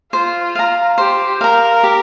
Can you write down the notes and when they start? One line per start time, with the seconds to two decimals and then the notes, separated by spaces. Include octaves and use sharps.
0.12 F4 C5
0.55 F5 A#5
0.98 G4 C5
1.41 A#4 F5 A#5
1.83 G4